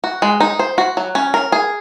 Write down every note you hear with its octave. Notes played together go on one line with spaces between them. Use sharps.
F#4
G#3
D#4
C5
F#4
F#3
C#4
A#4
G#4